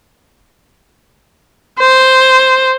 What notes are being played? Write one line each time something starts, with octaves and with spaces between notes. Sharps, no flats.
C5